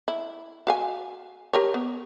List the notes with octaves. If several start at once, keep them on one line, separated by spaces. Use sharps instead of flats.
E4
F#4 F5 G#5
G4 A#4 C#5
B3